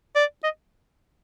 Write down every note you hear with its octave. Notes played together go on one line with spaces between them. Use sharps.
D5
D#5